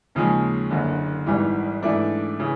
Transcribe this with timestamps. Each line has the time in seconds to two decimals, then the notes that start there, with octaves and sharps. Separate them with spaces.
0.15 D#2 C#3 F3 G#3
0.71 F#1 F#2 D3
1.26 G#1 G#2 E3 G3
1.83 G#2 E3 A3 D4
2.40 C#3 E3